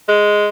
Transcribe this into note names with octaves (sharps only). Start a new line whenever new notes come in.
G#3